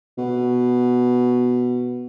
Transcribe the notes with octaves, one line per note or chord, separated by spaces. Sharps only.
B2